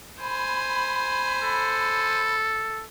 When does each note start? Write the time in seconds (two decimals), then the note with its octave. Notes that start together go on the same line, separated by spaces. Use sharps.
0.21 C5 G#5 B5
1.43 A4